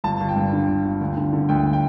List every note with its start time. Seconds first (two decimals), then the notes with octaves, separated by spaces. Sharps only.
0.04 G1 A5
0.20 G1
0.29 G5
0.36 G2
0.53 D3
0.68 G1
0.85 G1
1.01 D2
1.17 D3
1.33 D3
1.49 D2 G5
1.73 G5